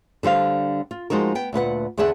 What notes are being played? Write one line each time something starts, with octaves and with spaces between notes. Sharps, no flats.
D3 G3 C5 F5
F4
F3 G#3 D#4 F#4 A#4
B3 G5
D2 A#2 B4 F#5
E2 D3 D4 G#4 E5 F#5